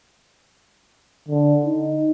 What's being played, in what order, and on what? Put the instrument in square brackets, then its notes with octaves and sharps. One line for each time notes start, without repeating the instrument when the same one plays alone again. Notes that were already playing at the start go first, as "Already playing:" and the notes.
[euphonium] D3
D#4